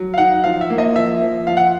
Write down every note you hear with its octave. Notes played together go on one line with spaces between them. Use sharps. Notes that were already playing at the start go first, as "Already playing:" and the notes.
Already playing: F#3
F5
D#4 F#5
F3 F5
E5
A#3
D#5
F3 E5
F3
F3 F5
F#5